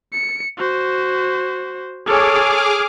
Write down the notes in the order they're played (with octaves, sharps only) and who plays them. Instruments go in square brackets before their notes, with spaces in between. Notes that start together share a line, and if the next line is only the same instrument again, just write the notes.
[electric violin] C#7
F#4 C5
[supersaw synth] G#4 D6 F6 [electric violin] A4 C#5